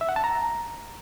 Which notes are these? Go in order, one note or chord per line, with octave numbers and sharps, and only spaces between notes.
E5
F#5
A5
A#5